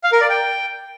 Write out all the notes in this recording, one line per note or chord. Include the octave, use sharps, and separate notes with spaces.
F5
A#4
D5
G5